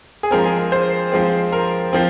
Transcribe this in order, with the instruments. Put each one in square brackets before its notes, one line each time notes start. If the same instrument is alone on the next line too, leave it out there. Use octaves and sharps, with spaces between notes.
[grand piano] G#4
F3 G#3 C4 A#4
G#4
A#4
C5
F3 G#3 C4
A#4
F3 C4